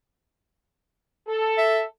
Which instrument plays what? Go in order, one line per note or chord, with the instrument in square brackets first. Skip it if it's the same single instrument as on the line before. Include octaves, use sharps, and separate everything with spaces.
[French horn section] A4
[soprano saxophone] E5